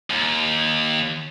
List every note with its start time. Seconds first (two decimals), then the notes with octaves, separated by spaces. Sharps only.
0.10 D#2